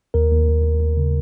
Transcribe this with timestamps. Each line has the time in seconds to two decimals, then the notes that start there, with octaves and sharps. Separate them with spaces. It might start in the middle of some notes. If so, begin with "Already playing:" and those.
0.14 D#2 A#4
0.31 D#2
0.47 D#2
0.64 D#2
0.80 D#2
0.97 C#3